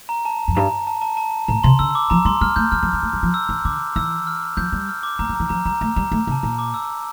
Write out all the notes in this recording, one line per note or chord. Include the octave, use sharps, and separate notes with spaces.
A#5
A5
F2
G2 A#5
A5
A5
A5
A2 A#5
C3 C6
D3 E6
D6
F3 A#5
G3 C6
G3 F6
A3 G6
G3 F6
F3
G3
A3
G3
F3
E6
E3
D3 D6
E3 E6
F6
F3 G6
G3
F6
D6
A3 A#5
G3
E3 A#5
F3 A#5
G3 A#5
A3 A#5
G3 A#5
A3
C3
A5
A#2 A#5
D6
E6